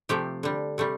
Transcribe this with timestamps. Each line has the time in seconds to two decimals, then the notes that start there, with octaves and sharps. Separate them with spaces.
0.09 C3 F3 A3 G4
0.43 D3 G3
0.78 C3 G3 A3